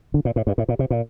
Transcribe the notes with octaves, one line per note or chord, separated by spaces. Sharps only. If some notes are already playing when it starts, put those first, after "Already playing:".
D3
A#2
A2
G2
A2
A#2
C3
A#2